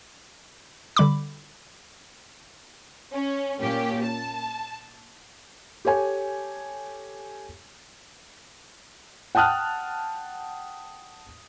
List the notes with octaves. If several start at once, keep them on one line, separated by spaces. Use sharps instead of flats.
D3 G3 B5 D6
C#4
A#2 A#3 C#4 G4
A5
G4 A4 C#5 G#5
F#5 G5 A5 D#6 F6 F#6